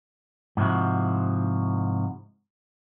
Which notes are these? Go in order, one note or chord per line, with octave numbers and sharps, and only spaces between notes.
G#2 C3 F3 E4 F#4